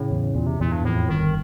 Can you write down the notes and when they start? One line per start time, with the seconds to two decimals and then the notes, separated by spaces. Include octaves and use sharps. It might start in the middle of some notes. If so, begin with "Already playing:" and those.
Already playing: A2 C#3
0.11 E2
0.35 E2 A#2
0.47 C3
0.60 E2 A#2
0.72 G2
0.84 F2 A2
1.09 G1 D#3